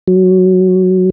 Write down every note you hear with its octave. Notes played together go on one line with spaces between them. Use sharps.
F#3